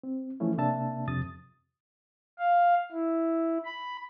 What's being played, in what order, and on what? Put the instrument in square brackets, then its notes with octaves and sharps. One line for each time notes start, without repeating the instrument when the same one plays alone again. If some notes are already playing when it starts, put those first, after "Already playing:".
[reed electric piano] C4
E3 F3 A3 C#4 E4
C3 A#3 D4 E5 A5
F2 C3 D#6 A6
[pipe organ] F5
E4
B5